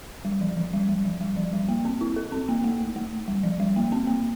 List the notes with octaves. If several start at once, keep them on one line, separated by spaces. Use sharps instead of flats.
G3
F3
F3
G3
G3
F3
G3
F3
G3
A#3
C4
E4
A4
C4
A#3
A3
A3
G3
F3
G3
A#3
C4
A#3